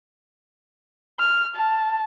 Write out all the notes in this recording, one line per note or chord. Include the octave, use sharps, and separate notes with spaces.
F6
A5